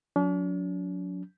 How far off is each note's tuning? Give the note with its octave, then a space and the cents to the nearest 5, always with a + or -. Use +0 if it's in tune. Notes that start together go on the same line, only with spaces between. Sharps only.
F#3 -30 D4 -45